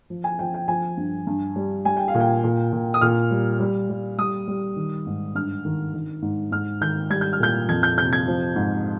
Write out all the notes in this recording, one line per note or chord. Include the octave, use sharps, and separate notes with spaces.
F3
G#5
F3 G5
G5
F3 G#5
G2
G2
G3
G3 G#5
G5
F5
A#2
G5
A#2
A#2
D#6
A#2 F6
G3
G3
G3
G3 D#6
G3
D#3
G#2
G2 F6
D#3
D#3
G#2
G#2 F6
D#3 G6
G3 G#6
G6
F6
A#2 G6
F2 G#6
G6
C3 G6
G#6
F3
G#2